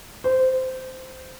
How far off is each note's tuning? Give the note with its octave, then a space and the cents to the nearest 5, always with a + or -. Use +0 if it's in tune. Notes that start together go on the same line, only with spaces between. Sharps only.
C5 -15